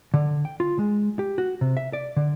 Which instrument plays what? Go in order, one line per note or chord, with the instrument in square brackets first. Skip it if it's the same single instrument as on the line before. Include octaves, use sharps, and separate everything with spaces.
[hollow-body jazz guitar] D3
G5
F4
G#3
G4
F#4
C3
E5
D5
D3